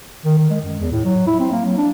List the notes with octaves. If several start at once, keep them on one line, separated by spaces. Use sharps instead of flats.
D#3
D#3
G#3
F#2
E2
A2
F#3
E4
C4
A#3
F#3
D4